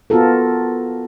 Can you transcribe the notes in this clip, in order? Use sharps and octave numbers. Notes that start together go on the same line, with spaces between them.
B3 F4 F#4 A4 A#4